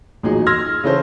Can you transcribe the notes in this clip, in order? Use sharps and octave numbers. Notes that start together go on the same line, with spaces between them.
A1 A#2 F#3 D#4 G#4
C6 E6 F6 G#6 A#6
C#3 E3 C#4 A4 C5